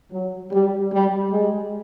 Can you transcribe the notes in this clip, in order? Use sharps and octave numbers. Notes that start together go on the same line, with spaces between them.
F#3
G3
G3
G#3